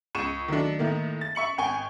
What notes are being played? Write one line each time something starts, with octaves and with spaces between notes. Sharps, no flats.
C#2 C#6 D#7 E7
D#3 F#3 A3 D4
A2 D#3 A3 A#3
A6
E5 C#6 C#7 F#7
G#1 G5 G#5 C#6